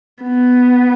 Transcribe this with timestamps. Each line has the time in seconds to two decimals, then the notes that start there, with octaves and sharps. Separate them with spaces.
0.23 B3